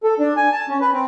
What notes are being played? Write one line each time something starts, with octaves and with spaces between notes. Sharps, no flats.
A4
D4
G#5
A5
C#4
B4
C4